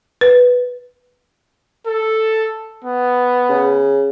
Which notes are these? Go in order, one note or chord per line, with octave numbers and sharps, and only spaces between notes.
B4
A4
B3
C#3